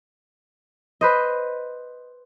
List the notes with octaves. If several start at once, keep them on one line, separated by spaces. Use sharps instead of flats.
B4 C5 D#5